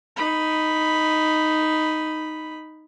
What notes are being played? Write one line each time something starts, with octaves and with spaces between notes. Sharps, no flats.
D#4 B5